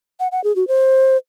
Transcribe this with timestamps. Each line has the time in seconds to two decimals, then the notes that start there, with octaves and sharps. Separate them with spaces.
0.20 F#5
0.32 F#5
0.44 G#4
0.56 F#4
0.68 C5